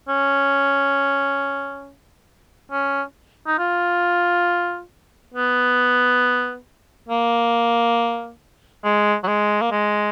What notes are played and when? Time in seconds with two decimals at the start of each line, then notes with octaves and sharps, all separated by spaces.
0.08 C#4
2.71 C#4
3.47 D#4
3.59 F4
5.34 B3
7.09 A#3
8.84 G#3
9.24 F#3
9.28 G#3
9.62 A#3
9.71 G#3